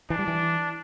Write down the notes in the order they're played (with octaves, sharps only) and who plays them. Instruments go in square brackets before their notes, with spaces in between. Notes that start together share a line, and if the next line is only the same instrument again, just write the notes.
[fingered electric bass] E3 [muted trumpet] D4
[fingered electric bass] G3
E3